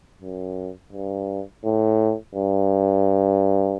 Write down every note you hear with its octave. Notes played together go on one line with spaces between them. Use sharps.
F#2
G2
A2
G2